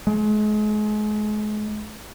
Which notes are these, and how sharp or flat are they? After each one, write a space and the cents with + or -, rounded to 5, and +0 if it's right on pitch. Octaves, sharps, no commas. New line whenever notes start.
G#3 +35